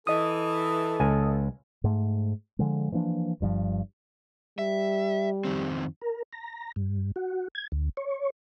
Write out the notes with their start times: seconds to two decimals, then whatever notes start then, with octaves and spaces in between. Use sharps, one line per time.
0.07 E3 A4 D#5 D#6
1.00 C#2 G#5
1.84 G#2 A3
2.59 D3 F3 G#3
2.92 E3 F3 A#3 D4
3.41 G1 G2 C#3 F3
4.59 G3 E5
5.45 F2 D#3 C4
6.02 A#4
6.33 A#5
6.76 G2
7.16 F#4
7.55 G#6
7.72 D2
7.97 C#5